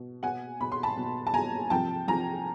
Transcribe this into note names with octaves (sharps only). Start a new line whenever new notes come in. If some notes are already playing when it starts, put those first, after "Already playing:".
Already playing: B2
B2 F#5 G#5
B2 B5
C6
A5 B5
B2
A5
B2 G#5 A#5
C3 F3 G5 A5
C3 F3 G#5 A#5